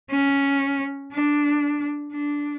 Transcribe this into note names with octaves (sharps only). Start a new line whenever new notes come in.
C#4
D4
D4